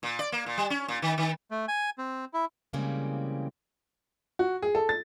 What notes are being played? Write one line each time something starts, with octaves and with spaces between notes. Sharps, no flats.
A#2
D5
A#3
A#2
G3
C#4
A#2
D#3
D#3
A3
G#5
C4
E4
C#3 E3 G3 G#3 A#3 C4
F#4
G#4
A4
A6